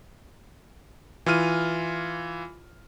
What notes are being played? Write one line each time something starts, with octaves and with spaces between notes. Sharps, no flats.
E3 F4 F6 D#7